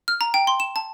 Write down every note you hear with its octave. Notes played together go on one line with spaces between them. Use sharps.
F6
A#5
G5
C6
E7
A5